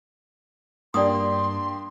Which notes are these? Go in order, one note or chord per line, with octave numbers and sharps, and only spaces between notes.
G2 A#3 D4 G4 D5 C6 D#6